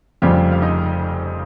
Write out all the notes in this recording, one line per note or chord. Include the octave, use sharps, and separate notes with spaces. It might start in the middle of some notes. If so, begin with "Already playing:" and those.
F1 F2 C#3 F3 G3 G4
F5
D#4 D#5